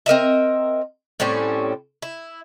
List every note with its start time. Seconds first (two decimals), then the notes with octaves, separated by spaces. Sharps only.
0.06 C4 A#4 D#5 E5
1.20 A2 G3 C4 C#4
2.02 E4